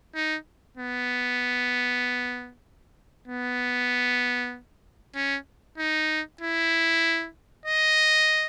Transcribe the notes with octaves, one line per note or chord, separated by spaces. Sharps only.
D#4
B3
B3
C#4
D#4
E4
D#5